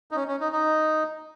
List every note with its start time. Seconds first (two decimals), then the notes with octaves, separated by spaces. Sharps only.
0.11 D#4
0.16 C#4
0.28 C#4
0.40 D#4
0.52 D#4